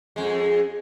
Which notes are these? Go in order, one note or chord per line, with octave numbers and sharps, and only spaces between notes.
F2 G#3